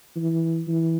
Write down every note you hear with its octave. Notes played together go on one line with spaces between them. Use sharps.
E3
E3